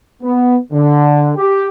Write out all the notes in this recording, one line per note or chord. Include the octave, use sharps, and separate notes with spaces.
B3
D3
G4